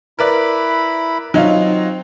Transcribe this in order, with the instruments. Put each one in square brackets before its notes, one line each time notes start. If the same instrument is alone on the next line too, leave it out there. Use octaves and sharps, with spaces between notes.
[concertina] E4 B5 [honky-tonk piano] A#4 B4 D5
[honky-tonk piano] F#3 D#4 F4 [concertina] C4